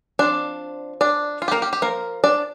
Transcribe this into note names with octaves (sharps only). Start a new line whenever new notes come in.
F3 C4 D4 D5
D4 D5
F4
G4
A#3 A#4
G4
G4
F3 A#3 A#4
D4 D5